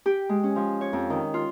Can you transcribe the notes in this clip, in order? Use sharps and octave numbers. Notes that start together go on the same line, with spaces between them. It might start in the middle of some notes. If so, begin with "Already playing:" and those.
G4
G#3
C#4
F3
C#5
F2
D#3
F4